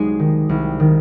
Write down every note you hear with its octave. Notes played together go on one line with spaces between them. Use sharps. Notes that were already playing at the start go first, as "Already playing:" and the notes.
Already playing: C2 G#3 D#4 F#4 G#4
D#3
C2
D#3